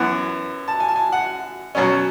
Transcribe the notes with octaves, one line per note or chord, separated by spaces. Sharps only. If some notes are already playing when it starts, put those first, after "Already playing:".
Already playing: F#2 E3 B3 F#5
A5
G#5
A5
G#5
F#5
B2 F#3 C#4